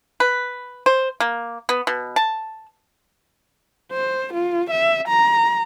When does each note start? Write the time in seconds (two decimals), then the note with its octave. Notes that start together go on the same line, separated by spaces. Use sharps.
0.20 B4
0.86 C5
1.20 A#3
1.69 B3
1.87 B2
2.16 A5
3.92 C5
4.34 F4
4.70 E5
5.08 A#5